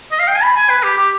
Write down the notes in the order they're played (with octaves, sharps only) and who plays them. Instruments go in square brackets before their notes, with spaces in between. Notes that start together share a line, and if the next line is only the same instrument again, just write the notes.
[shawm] D#5
F5
G5
G#5
B5
G#5
B4
G4
G4